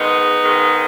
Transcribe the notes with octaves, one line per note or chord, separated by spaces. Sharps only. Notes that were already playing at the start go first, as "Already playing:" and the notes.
Already playing: G#2 D#3 G#3 B3 D#4
G#2 D#3 G#3